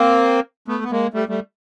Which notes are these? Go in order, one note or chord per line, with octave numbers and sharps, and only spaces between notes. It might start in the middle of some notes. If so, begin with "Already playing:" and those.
Already playing: A#3 C4
A3 B3
B3
G#3 A#3
G3 A3
G3 A3